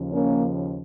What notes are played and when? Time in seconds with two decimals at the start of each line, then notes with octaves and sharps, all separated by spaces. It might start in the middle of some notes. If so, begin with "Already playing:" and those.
Already playing: D#2 C#3 F3
0.13 A#3 C#4